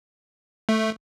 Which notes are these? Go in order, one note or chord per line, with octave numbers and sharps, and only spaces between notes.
A3